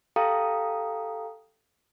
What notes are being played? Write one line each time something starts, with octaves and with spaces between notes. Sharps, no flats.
G4 A4 F5 G5 A#5 D#6